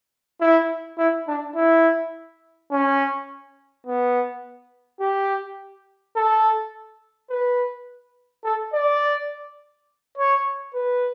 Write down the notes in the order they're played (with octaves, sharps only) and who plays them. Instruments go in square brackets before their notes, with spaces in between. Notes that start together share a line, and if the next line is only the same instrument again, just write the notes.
[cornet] E4
E4
D4
E4
C#4
B3
G4
A4
B4
A4
D5
C#5
B4